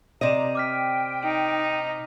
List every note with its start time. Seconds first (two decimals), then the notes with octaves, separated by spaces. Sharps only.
0.21 C3 D5 D#5 A#5 D#7 E7
0.55 G5 D6 F6 B6
1.24 D#4